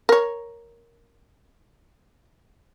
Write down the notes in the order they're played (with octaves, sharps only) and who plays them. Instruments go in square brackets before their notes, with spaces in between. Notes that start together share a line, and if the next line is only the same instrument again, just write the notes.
[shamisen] A#4 C#5